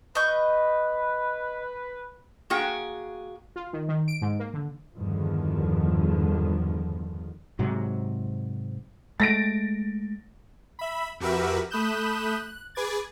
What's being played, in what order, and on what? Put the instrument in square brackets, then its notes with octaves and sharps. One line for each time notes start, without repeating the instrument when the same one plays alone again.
[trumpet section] B4 [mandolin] D#5 C#6 G6
[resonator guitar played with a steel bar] A#3 F#4 G#4 G5
[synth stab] F4
D#3
D#3
D7
G#2
A#3
D3
[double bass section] E2 G2 D3 D#3 F3
[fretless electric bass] G#2 C3 F#3
[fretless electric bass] G#3 A3 [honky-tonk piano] A6 A#6 D7
[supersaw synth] E5 B5
F2 F#4 G4 A#4 B4 E5
A3 B5 D#6 F#6 G6 E7
F#6
G#4 B4 D6 G#6 A6